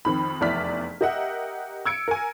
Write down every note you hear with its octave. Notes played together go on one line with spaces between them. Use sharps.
F2 D#3 B5
F1 E2 E4 D5 F6 B6
G4 A#4 D#5 E5 F#5
E6 G#6 C#7 D7
A#4 G#5